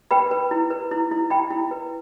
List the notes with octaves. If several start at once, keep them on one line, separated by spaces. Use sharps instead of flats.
B4 G5 B5
B4
E4
B4
E4
E4
E4 G5 B5
E4
B4